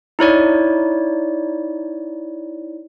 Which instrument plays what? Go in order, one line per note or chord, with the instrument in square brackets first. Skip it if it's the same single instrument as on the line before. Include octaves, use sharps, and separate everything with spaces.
[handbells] D#4 E4 C#5 D5